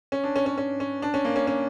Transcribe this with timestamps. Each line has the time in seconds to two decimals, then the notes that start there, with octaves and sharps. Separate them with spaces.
0.12 C#4
0.24 D4
0.36 C#4
0.46 C#4
0.58 C#4
0.80 C#4
1.02 D4
1.14 C#4
1.25 A#3
1.36 C#4
1.47 C#4